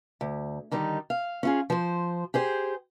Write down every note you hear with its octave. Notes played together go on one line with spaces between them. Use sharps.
D2
D3 D#3 G3 D#4
F5
C#4 F4 G#4
F3 C5
G4 G#4 C5